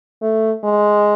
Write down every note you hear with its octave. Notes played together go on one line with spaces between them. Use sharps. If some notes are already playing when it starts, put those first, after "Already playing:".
A3
G#3